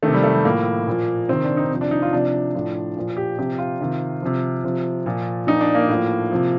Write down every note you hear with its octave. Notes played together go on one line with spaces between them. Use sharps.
D#3 A3
C3
G3
A3
G3
A2 F3 A#3
A#2 F3
C3 D#3 C4
D4
D#4
C3 F3
D4
D#4
F4
C3 F3 D4
A2 F3
A#2 F3
G4
C3 F3 G4
F4
C3 D#3
C3 F3
C3 F3
A#2 F3
A#2 F3 D#4
D4
A#3
A2
F3
C3 F3